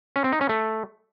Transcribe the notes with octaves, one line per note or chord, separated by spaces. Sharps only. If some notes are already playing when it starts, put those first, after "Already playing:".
C#4
C4
D#4
C#4
A3